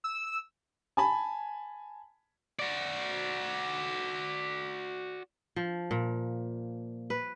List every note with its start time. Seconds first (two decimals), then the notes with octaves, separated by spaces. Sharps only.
0.04 E6
0.97 G#5 A5 B5
2.59 F#4 D5
5.56 F3
5.91 A#2
7.10 B4